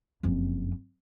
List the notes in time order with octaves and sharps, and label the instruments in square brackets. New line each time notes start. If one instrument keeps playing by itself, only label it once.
[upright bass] F#1 F2